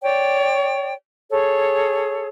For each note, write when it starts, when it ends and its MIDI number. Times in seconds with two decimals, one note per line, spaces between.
0.02 0.94 73
0.02 0.94 74
0.02 0.94 79
1.31 2.27 68
1.31 2.27 69
1.31 2.27 73